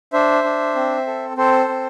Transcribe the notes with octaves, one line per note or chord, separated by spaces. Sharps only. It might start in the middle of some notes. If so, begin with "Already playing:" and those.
D4 C5 E5
D4
C4
A4
C4 A4 C5
C4